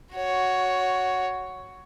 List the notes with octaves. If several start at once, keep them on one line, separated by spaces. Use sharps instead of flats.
F#4 C#5